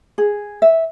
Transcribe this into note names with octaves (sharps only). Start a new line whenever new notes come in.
G#4
E5